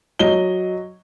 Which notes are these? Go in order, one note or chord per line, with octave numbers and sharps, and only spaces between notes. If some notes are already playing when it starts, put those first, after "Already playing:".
F#3 D#5 G7